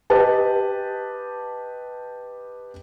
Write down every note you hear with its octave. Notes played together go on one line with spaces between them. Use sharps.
G4 B4 D#5 A5